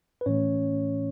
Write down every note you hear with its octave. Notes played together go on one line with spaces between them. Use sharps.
B4
A2 E3 A3 C#4 C#5